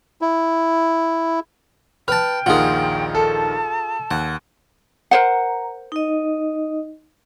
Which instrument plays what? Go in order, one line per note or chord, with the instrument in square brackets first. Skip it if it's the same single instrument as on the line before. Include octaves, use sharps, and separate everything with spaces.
[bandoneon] E4
[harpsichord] B4 A5 [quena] G5 [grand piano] F6
[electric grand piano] A#1 D#2 D#3 [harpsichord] F4 G#4 [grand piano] F#5
[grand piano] A4 [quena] A5
[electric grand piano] D#2 [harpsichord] F#5
[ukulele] A#4 C5 F#5 [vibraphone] A#5
[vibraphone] D#4 D#5